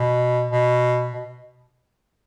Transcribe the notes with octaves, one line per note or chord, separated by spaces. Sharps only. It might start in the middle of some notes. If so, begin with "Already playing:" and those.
Already playing: B2
B2
B2